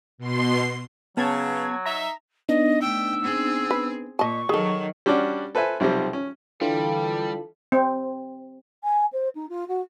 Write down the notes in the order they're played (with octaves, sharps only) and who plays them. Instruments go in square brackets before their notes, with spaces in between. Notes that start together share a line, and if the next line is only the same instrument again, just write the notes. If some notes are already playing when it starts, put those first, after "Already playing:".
[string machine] B2 C6 C7
[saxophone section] C#3 [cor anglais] F#3 [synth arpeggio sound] B3 A5 G#6
[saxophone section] D#4 E5 [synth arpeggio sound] A#5
[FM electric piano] B3 D4 D#4 [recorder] D#5
[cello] A3 G5 [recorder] E6
[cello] C4 G#4
[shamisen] B4
[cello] A#2 [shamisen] D#5 A5 [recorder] C#6
[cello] D#3 F#3 [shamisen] G#4 A4
[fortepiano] G3 C#4 D4 F#4 D5
A4 B4 C5 E5 G#5
B1 C3 F3 G3
C#4
[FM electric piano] D3 E3 F4 [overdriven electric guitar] G3 [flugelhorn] A4
[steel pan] C4
[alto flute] G#5
C5
D#4
F4
F#4